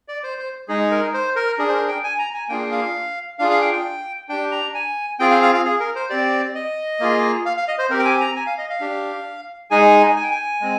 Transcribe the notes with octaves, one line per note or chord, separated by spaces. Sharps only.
D5
C5
C5
G#3 D#4 G#4
A#4
C5
A#4
D4 G#4
C5
A#4
G5
G#5
A#5
G#5
A#3 D4 F4 G#4 G5
F5
D4 F4 G#4 F5
F5
G5
G5
D4 G4 G5
A#5
G#5
C4 F4 G#4 G5
F5
F5
F5
G#4
A#4
C5
C4 G4 D5
D#5
A#3 F4 G#4
F5
F5
D#5
C5
C4 G4 A#4
G5
G#5
A#5
G#5
F5
D#5
F5
D4 G4
G#3 D#4 G#4 G#5
G#5
G5
G#5
G#3 C4